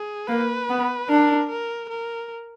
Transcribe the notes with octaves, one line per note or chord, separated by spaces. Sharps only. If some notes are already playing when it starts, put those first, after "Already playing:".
Already playing: G#4
A#3 B4
B3
D4 A#4
A#4
A#4